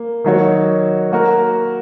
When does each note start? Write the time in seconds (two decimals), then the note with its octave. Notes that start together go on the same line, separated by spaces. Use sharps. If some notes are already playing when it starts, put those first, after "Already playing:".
Already playing: A#3
0.24 D#3 F#3 D#4 F#4 C#5
1.12 A#3 F#4 A#4